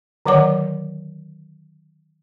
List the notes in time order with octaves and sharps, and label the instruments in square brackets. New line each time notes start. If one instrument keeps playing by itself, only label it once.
[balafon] D3 D#3 F#3 C#5 F#5 D6